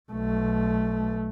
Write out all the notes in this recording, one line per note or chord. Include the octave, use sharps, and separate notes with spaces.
B1 A3